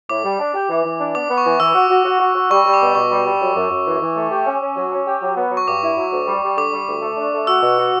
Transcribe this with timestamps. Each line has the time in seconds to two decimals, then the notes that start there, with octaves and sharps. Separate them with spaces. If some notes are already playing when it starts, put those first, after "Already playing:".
0.09 A2 D6
0.24 G3
0.40 D4
0.54 G4
0.70 E3
0.85 E3
0.99 D4
1.15 B3 D6
1.29 B3
1.38 C#6
1.45 E3
1.60 E3 E6
1.75 F#4
1.90 F#4
2.05 F#4
2.20 F#4
2.35 F#4
2.50 G3 C#6
2.66 G3
2.74 D6
2.81 B2
2.95 B2 C#6
3.11 G3
3.26 G3
3.41 F#2
3.56 F#2
3.71 F#2
3.87 E3
4.02 E3
4.16 A3
4.31 G4
4.47 C#4
4.61 C#4
4.76 F#3
4.92 C#4
5.07 G4
5.21 F#3
5.37 B3
5.52 F#3
5.57 C#6
5.67 G2 D6
5.82 E4
5.97 F#3
6.12 D2
6.27 G3
6.43 G3
6.57 D3 D6
6.73 G3
6.88 D2
7.02 A3
7.17 D4
7.33 A3
7.47 F#4 E6
7.63 B2
7.78 F#4